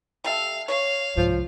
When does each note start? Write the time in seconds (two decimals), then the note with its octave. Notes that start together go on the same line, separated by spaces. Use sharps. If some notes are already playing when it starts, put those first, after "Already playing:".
0.24 G3 A4 E5 F5
0.68 C#5 F5
1.17 C2 G#2 F3